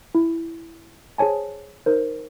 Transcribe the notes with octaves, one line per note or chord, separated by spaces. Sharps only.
E4
G#4 C5 C#5 G#5 A5
D#4 A#4 C5